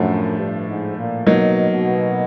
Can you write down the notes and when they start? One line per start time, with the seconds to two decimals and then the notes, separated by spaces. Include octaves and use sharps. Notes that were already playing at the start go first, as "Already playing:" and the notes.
Already playing: F#2 A2 F3 A3 D4
0.38 G2
0.68 G#2
0.97 A#2
1.27 B2 F#3 A#3 D#4
1.71 B2